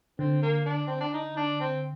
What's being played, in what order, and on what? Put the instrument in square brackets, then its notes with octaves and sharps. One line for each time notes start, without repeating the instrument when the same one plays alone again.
[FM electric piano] D3 [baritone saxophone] C4
[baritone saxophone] A#3
D4
C4
D4
D#4
D4
C4